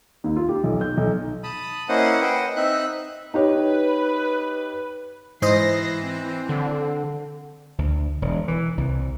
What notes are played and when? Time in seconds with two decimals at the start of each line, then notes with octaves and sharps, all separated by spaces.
0.24 D#2
0.36 F4
0.49 G4
0.64 B1
0.81 G6
0.97 B1
1.43 A5 B5 D#6
1.89 A#3 C#4 E4 C5 D#5 F#5
2.22 B4 C5 D#5 F#5 G5
2.56 C4 D#4 E5 F#6
3.34 D#4 G4 B4 C#5
5.42 G#2 E3 C5 D#5 A#6 C7
6.02 C4
6.49 D3
7.78 D2
8.22 E1
8.48 E3
8.77 C2